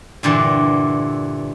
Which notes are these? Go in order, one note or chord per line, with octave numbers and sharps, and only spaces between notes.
G2 A#2 D3 E3